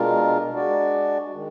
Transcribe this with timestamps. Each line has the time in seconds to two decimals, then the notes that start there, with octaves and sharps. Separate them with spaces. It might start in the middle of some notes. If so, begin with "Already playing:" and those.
Already playing: B2 G#3 D4 F4 A#4
0.54 G#3 D4 F#4 D5
1.34 D#3 G#3